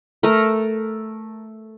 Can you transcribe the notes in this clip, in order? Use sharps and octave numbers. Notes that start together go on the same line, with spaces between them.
A3 A#4